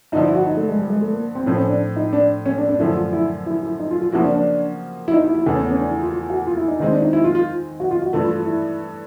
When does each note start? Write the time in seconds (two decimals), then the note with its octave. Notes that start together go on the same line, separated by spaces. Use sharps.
0.12 G2 D3 F3 D#4
0.24 E4
0.34 F#4
0.46 D#4
0.57 A3
0.69 G#3
0.79 G3
0.90 G#3
1.02 A3
1.12 A#3
1.35 C4
1.46 A2 F3 A3 C4 C#4
1.57 C#4
1.68 D4
1.96 D#4
2.13 D4
2.46 C#4
2.58 D4
2.69 D4
2.79 F#2 D3 F3 A3 C#4 E4
2.96 F4
3.13 E4
3.46 E4
3.63 E4
3.80 D#4
3.91 F4
4.02 F4
4.12 C#3 F3 A#3 C#4 E4 F#4
4.23 D4
4.35 D4
5.08 E4
5.13 D#4
5.24 E4
5.35 E4
5.46 E2 C#3 E3 A3
5.55 C#4
5.63 B3
5.71 C#4
5.79 D4
5.91 E4
6.02 F4
6.12 F4
6.30 F#4
6.47 F4
6.57 E4
6.68 D#4
6.79 D#3 G#3 C4 D#4
6.91 D4
7.02 D#4
7.13 E4
7.24 F4
7.35 F4
7.80 F#4
7.91 F4
8.02 F#4
8.13 G2 E3 A3 F4
8.24 F4
8.36 F4
8.46 E4